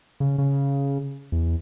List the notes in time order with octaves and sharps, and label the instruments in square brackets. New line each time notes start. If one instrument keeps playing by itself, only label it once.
[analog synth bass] C#3
C#3
E2